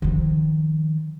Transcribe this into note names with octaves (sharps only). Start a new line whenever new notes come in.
D#3 F3